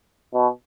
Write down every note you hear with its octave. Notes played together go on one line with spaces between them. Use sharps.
B2